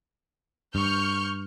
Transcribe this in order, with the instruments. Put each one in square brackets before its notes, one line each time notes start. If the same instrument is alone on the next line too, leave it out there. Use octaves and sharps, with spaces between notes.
[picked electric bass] G2 [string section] C#6 F6 G6